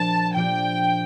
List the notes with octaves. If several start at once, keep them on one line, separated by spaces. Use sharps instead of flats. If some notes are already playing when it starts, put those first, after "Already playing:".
Already playing: A#2 F3 A#3 D4 G4 A5
A#2 F3 A#3 D4 G4 G5